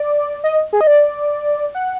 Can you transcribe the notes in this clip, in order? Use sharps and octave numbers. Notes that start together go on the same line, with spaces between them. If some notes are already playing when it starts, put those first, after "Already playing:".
Already playing: D5
D#5
G#4
D#5
D5
F#5